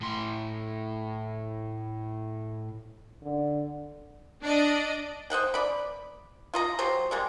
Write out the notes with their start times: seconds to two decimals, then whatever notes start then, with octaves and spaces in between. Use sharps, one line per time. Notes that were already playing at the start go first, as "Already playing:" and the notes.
0.01 A2 C6
3.22 D3
4.42 D4 D5 D#5
5.30 C5 D#5 F#5 G5
5.54 D5 B5
6.54 F4 D#5 A#5
6.79 F#3 G4 C5
7.11 G3 G#3 A#3